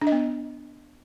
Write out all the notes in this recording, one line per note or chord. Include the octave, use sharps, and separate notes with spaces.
D4
D#5
B3